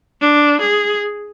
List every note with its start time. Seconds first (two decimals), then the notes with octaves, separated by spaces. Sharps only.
0.20 D4
0.60 G#4